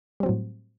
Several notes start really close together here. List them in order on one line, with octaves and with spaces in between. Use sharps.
G3 C4 F#3 A2